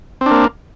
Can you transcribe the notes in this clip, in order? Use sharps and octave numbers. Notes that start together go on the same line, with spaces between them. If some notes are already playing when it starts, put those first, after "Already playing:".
A#3 C4 D4